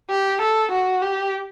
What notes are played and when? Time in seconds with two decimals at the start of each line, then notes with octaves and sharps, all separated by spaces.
0.10 G4
0.42 A4
0.72 F#4
1.02 G4